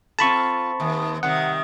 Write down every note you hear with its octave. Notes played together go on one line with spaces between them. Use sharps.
C4 F4 A4 A5 B5 C#6
D#2
C3 D#3 G3 F#5